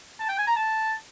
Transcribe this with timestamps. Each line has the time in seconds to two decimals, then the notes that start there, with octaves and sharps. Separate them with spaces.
0.20 A5
0.29 G5
0.38 G#5
0.47 A#5
0.56 A5